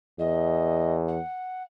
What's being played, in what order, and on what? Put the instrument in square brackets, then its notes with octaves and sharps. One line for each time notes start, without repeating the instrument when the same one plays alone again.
[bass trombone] E2 [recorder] D#5
[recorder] F#5